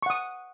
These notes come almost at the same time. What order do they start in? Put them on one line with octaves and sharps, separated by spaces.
C#6 F#5 D#6